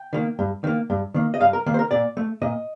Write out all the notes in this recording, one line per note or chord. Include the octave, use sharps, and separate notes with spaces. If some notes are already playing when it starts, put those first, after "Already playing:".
Already playing: G5
D#3 A#3
G2
D#3 A#3
G2
D#3 A#3
D#5
G2 F5
A#4
D#3 A#3
C5
A#4
A#2 D5
A3
A#2 D#5